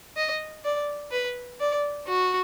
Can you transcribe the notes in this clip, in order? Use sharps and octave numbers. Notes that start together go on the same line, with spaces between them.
D#5
D5
B4
D5
F#4